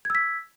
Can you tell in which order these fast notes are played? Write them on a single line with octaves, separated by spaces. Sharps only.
G#6 E6 B6